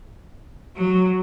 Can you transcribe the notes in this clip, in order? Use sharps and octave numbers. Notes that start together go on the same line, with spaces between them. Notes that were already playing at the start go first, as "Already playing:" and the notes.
F#3